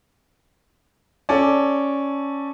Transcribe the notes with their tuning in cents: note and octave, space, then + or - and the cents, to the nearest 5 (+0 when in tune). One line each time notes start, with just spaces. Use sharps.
C#4 +0 A4 +0 D5 +0